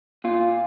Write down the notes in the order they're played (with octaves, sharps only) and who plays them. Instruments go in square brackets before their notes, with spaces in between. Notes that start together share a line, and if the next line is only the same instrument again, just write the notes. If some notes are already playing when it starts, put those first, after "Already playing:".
[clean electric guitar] A#2 F4